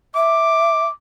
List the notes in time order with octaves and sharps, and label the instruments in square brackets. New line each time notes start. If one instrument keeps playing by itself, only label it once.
[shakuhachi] E5 [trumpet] D6